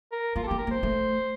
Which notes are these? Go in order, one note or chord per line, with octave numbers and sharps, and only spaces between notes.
A#4
A#3 F4
A4
A#3 G4
A#4
A#3 C5
A3